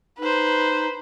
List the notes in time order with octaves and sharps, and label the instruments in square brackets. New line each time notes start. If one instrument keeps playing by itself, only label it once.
[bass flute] D#4 [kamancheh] B4 C5